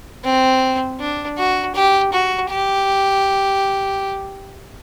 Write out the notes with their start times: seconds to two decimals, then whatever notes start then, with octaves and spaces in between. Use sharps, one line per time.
0.24 C4
0.99 D4
1.38 F#4
1.75 G4
2.12 F#4
2.50 G4